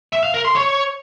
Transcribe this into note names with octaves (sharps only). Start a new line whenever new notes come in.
E5
F5
A#4
C6
C#5